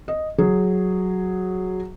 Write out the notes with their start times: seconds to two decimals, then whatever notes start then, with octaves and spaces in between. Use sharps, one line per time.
0.08 D#5
0.38 F#3 G#4